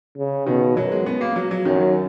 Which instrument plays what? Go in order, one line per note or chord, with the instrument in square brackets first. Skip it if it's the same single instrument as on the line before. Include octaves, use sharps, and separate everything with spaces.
[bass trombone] C#3
[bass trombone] B2 [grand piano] D#3
[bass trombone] F#2 [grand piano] F#3
[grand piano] G#3
B3
A#3
F#3
F#3
[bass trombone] F#2 [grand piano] D#3